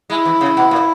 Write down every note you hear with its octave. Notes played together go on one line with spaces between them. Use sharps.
G#3 E4
E3
C#3
B2
A#2